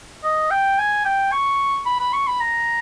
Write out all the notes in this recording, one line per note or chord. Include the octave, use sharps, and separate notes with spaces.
D#5
G5
G#5
G5
C#6
B5
B5
C#6
B5
A#5